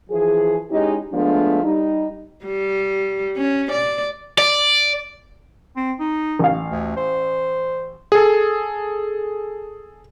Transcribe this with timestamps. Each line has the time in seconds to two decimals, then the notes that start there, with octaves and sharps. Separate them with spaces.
0.10 E3 F3 G#4
0.71 G#3 C#4 D#4 E4 G4
1.12 F3 G#3 A3 B3 D4
1.63 G3 D#4
2.45 G3
3.37 C#4
3.71 D5
4.38 D5
5.77 C4
6.00 D#4
6.39 A1 F5
6.70 D2
6.96 C5
8.12 G#4 A4